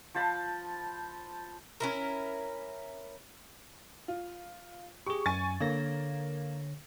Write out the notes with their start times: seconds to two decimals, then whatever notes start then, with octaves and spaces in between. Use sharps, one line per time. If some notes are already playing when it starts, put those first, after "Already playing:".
0.14 F3 C5 A5 B5
1.80 C#4 E4 A#4
4.08 F4
5.06 G4 G#4 C#6
5.26 F#2 G#5 C#6 A6
5.60 D3 A#3 C#5 A#6